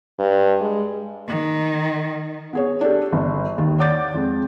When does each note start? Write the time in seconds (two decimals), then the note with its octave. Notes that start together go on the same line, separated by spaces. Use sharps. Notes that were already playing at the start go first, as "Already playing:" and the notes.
0.19 G2
0.61 G#3
1.28 D#3
2.53 B3 G#4 C#5
2.81 D4 G4 A4
3.13 G1
3.58 D#2 D#3
3.78 C#5 D5 F#5 D6 G6 A6
4.14 F2 G#3